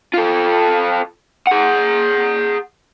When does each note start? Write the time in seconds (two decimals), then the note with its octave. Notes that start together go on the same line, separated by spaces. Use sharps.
0.14 F4 A4
1.47 G#4 F#5